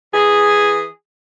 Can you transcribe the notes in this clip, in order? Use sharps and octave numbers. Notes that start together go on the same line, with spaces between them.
E3 G#4